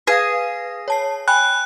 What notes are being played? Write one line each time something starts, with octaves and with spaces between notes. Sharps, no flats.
G#4 B4 F5 A#6
C#5 A5 C7
G5 G#5 B5 F#6